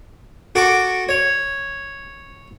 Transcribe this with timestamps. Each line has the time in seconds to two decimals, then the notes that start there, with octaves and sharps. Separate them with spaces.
0.55 F#4 A4 C#6 D6
1.09 C#5